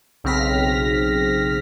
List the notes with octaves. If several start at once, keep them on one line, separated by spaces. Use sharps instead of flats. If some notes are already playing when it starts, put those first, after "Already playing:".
B1 C#3 C4 F6 A#6 B6